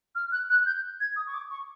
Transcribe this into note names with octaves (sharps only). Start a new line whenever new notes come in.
F6
F#6
F#6
G6
G#6
D#6
C#6
D6
C#6